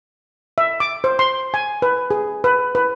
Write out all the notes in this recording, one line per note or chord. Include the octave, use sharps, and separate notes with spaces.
E5
D6
C5
C6
G#5
B4
G#4
B4
B4